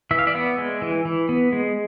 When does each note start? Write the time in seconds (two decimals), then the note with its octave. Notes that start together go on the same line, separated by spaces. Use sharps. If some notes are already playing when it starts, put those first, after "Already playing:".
0.11 E3 E5
0.19 F5
0.27 D5 E5
0.35 B3
0.58 G#3
0.82 E3
1.05 E3
1.29 B3
1.53 G#3